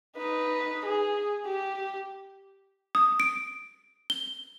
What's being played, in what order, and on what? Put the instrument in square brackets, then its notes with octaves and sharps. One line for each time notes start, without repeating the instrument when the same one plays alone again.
[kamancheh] D#4 B4
G#4
G4
[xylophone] D#6
D7
G7